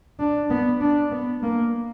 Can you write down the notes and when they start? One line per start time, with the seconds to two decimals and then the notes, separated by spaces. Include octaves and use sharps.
0.19 D4
0.50 B3
0.81 D4
1.11 B3
1.43 A#3